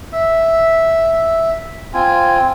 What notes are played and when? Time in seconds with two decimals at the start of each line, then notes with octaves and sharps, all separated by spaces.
0.12 E5
1.94 C4 F4 G#5